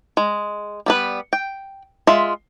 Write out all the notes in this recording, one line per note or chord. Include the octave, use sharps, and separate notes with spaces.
G#3
G3 B3 B4
G5
G#3 F4 E5